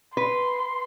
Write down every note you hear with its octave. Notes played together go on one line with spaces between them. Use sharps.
B4 C6